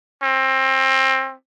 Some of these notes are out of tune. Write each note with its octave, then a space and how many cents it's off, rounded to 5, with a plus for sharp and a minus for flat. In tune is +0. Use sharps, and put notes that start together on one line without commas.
C4 +25